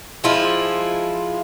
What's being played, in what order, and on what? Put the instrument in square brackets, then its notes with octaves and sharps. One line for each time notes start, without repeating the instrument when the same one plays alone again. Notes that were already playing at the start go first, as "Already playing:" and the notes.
[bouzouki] F3 G#3 E4 F4